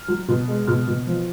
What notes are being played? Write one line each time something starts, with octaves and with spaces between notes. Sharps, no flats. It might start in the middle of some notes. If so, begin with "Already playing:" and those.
Already playing: F6
F#3
B2
G#3
B2 F6
B2
F3